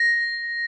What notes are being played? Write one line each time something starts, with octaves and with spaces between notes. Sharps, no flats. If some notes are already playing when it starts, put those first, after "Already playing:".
Already playing: A#6